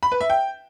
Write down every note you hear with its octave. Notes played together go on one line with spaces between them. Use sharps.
B5
B4
E5
G5